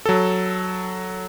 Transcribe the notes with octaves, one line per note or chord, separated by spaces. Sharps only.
F#3 A4